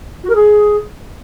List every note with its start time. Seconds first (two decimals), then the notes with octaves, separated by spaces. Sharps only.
0.24 F#4
0.29 A#4
0.35 G#4